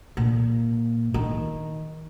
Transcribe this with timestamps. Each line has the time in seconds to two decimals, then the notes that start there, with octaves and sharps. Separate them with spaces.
0.17 A#2
1.14 D#3